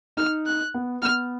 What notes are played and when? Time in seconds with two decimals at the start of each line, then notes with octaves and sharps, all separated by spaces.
0.17 D#4 F6
0.46 F#6
0.74 B3
1.02 B3 F6